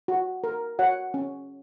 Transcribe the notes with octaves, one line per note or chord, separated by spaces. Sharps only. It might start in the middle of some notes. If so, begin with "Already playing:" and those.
F#4
A#4
F#4 C#5 F#5
C#4